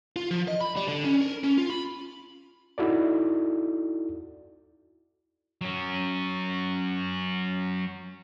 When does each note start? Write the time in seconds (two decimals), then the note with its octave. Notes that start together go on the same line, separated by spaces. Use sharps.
0.16 F4
0.31 F3
0.48 D#5
0.61 B5
0.77 G3
0.88 D3
1.05 C#4
1.21 A#4
1.44 C#4
1.58 F4
1.70 B5
2.78 D#4 E4 F#4 A4 D5
5.61 F#3 C#4